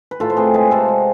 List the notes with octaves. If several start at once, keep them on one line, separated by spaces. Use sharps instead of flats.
B4
A2 F4 A4
C5
C4 G#4 B4
G#3 G#4 B4
C3 F4 A4
G#3